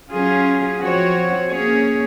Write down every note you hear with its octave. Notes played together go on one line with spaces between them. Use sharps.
F#3 C#4 F4 G#4
F3 C4 F#4 C#5
A#3 C#4 G#4 C#5